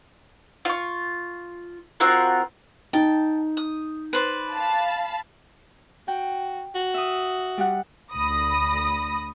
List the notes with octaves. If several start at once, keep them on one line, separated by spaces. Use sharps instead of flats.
F4 C#6
C4 F4 F#4 A#4
D#4 G5 A5
D#6
B4 C5 D5
F5 A5 B5
F#4 G5
F#4
E5 D#6
G3 F#5
D2 B5 D#6 A#6